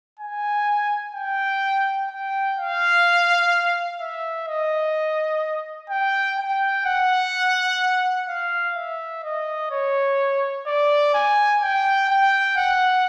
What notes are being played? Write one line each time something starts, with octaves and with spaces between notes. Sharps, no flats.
G#5
G5
G5
F5
E5
D#5
G5
G5
F#5
F5
E5
D#5
C#5
D5
G#5
G5
G5
F#5